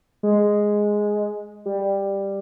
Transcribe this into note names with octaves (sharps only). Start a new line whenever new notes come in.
G#3
G3